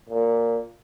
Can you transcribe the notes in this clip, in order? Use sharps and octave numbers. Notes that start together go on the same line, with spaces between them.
A#2